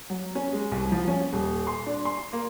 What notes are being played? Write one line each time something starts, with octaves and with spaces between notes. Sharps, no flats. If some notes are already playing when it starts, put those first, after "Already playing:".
F#3
C#4
G#3
C2
F3
C#4
D#1
C6
D4
C6
A#3